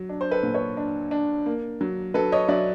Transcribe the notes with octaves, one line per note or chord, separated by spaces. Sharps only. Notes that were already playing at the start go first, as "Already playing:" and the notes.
Already playing: F#3
D4
C5
A4 B4
A#2
B4 C#5
D4
D4
A#3
F#3
F#3 A4 B4
C#5 D#5
F#3 D5 E5